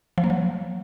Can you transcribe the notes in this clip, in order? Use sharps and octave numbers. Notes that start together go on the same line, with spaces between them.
F3
A#3
F#3